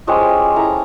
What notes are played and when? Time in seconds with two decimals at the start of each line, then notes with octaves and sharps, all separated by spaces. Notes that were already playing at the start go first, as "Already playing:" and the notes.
0.07 F3 G3 G#3 C#4
0.56 E4 A4 A#5